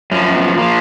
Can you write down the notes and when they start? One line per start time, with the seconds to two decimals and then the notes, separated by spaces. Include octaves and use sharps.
0.11 F#2 F3 C#4
0.35 B3
0.58 F3 A#3